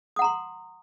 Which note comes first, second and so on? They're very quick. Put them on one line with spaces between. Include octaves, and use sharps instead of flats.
D#6 F#5 A#5 C6